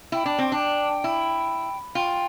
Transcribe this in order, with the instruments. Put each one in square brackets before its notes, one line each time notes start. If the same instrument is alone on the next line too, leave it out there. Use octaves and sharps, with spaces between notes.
[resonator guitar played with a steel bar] E4 [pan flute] G5
[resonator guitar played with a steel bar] D4
C4
D4
E4
[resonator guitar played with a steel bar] F4 [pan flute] G5